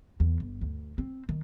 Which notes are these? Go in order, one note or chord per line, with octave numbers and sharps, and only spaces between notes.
E2
G1
D2
C4
D#3